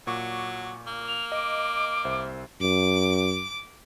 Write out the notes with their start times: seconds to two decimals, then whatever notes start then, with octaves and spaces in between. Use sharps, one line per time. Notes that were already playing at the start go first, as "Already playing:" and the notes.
0.07 A#2 F#3 C#6 D6
0.87 A#3
1.08 F7
1.32 D#5 D6
2.05 C2 C5 E5
2.61 F#2 D6